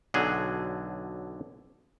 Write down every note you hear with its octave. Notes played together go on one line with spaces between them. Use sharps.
B1 D3 F#3 G#4